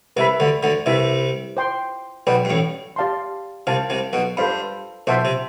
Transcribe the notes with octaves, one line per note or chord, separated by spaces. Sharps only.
C2 C3 B4 E5 B5
D2 D3
D2 D3
C2 C3 E4 B4 E5
C5 G5 C6
B1 B2 B4 D5 G5 B5
G2
A1 A2
G4 D5 F5 A5 C6
C2 C3 C5 F5 A5
C2 C3
B1 B2
G2 A4 C5 F5 B5
B1 B2 C5 E5 A5 C6
C3